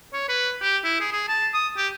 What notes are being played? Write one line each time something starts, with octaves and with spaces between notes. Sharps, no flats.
C#5
B4
G4
E4
G#4
G#4
A5
D#6
G4